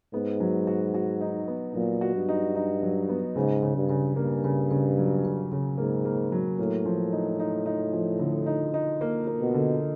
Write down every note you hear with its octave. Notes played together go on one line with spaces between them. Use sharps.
G#2 B3
F#3
F#4
F#4
D#4
B3
A#2 F#3
F#4
G2
D#4
D#4
F#3
B3
G#2 C#3
C#3
G2
C#3
G2 A#3
C#3
C#3
F#3
C#3
C#3
G#2 A#3
A#3
F#3
A2 A#3
F3
D#4
D#4
D#4
F3
D3
D#4
D#4
A#3
A#3
B2
D3